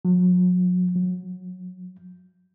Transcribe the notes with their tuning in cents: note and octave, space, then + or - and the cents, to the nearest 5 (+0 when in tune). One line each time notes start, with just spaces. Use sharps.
F#3 -40
F#3 -20